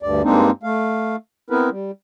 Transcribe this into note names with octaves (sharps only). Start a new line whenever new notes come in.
D2 G2 D5
G2 G#3 A#3 C4 D4 D#4
A3 F5
B3 C4 E4 A#4 B4
G3